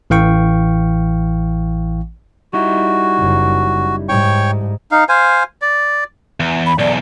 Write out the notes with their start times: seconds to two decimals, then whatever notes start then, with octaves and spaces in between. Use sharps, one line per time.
0.10 A1 E3 F5 G5 C#6
2.53 G3 D#4 E4 F#4
3.19 F#1 F#2
4.09 G#2 C#5 G5 C#6
4.91 D#4 F5
5.09 C5 F5 G#5
5.62 D5
6.40 E2
6.66 B5
6.79 B1 E2 D5